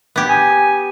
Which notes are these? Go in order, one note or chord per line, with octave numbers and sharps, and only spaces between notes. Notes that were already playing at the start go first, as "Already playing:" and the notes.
B3 G4
G#5